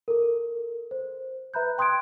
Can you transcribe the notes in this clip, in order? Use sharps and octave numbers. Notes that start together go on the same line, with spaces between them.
A4 A#4
C5
B4 E5 A#5 B5 F#6 G6
G5 C6 D#6 F#6 G#6 D7